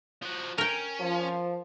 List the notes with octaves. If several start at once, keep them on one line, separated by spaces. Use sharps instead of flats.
F3 F#4
C#4 A#4 G5
F3